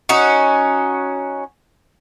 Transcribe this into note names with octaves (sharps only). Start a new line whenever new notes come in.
C#4 D#4 F#4